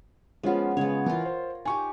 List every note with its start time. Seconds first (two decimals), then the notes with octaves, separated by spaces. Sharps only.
0.43 F3 G#3 B3 C#4 F4
0.77 C#3 G#3 B3 C#5
1.06 E3 F4 A#4
1.25 C5
1.65 D#4 G4 G#5 C#6